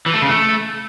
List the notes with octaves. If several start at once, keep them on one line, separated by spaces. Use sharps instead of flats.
E3
A3
C#3
A3